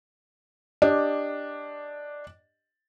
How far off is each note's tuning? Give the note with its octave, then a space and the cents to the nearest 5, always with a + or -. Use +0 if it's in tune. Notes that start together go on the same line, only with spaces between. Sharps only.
D4 +0 G4 +5 D#5 +0